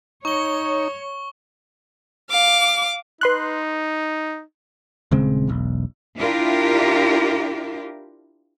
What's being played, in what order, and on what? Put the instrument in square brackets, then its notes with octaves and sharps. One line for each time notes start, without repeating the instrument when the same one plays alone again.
[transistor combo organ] D#4 [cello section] C#5 [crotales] C#6 G7
[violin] F5 D6
[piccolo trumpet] D#4 [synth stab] B4 C6 F#6
[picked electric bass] D#1 C#3 G#3 C4
E1 B1
[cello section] D4 E4 F4 G4 A#4